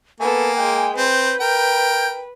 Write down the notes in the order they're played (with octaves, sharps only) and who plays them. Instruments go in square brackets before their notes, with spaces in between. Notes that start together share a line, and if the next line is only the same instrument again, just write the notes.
[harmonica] A#3 [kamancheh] B3 A4 [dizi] G#5
[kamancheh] G#3 G5
[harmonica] C4 [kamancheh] B4 [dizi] G6
[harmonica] A#4 G5 [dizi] G6